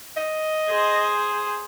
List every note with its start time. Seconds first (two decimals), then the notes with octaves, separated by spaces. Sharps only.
0.17 D#5
0.69 G#4 C5